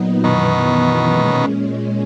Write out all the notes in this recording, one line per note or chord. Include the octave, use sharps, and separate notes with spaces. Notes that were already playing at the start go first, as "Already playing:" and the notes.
Already playing: A#2 F#3 B3 D#4
F#2 B2 D#3 E3 B3
A#2 G#3 C#4